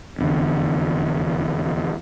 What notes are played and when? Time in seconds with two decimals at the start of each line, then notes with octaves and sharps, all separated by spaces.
0.18 F1 E2 D3